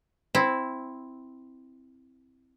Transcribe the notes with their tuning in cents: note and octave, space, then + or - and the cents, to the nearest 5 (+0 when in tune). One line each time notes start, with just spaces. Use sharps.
C4 +0 E4 -5